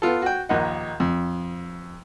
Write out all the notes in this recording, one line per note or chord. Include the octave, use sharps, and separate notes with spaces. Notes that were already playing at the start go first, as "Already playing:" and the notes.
B3 F4 A4
F#4 G5
A#1 D#2 D#4 D#5 F#5
F2